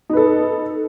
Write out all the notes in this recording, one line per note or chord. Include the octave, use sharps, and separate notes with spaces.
D#4 A4 B4